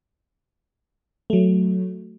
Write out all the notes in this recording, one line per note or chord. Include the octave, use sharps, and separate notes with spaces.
F#3 A3